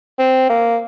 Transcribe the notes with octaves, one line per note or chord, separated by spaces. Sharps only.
C4
A#3